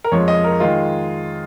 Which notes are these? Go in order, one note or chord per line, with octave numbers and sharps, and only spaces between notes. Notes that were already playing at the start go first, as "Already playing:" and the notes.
A#4
F2 F3 G#3 C#5
D#5
A#4
D#3 G#3 F4